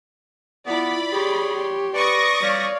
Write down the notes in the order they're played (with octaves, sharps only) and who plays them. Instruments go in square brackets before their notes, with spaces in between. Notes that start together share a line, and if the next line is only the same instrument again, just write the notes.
[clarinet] B3 [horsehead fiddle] E4 F4 [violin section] D5 B5
[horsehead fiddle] G4 [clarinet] G#4 [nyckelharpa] C#5 C6
[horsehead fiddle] G4
[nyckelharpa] B4 [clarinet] D5 [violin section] C#6 D#6 A#6
[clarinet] G3 [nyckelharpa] C#5 F5 [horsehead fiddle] D5